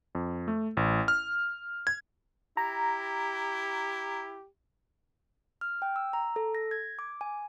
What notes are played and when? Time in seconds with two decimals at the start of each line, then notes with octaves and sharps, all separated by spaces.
0.15 F2
0.48 A3
0.77 A1
1.08 F6
1.87 G#6
2.57 E4 G4 A#5
5.61 F6
5.82 G5
5.96 E6
6.13 A#5
6.36 A4
6.55 A#6
6.71 G#6
6.99 D6
7.21 G#5